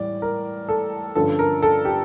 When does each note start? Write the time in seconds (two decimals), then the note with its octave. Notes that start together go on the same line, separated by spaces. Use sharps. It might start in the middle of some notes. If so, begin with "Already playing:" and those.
Already playing: A2 E3 G3 D5
0.22 A#4
0.69 A4
1.15 G2 D3 F3 C#4 A4
1.39 A#4
1.62 A4
1.85 G4